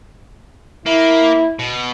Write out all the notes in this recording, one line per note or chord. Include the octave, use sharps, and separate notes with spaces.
A#3 E4
B2